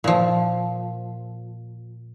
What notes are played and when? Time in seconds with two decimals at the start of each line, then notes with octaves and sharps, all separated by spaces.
0.04 A#2 F3